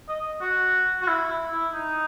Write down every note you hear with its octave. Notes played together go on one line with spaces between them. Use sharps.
D#5
F#4
F#4
E4
E4
E4
D#4